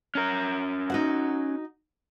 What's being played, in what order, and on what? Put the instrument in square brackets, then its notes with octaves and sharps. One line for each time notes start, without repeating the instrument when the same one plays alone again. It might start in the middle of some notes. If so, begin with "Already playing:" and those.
[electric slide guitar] C#4 A#4
[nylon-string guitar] D#4 F#4 F#5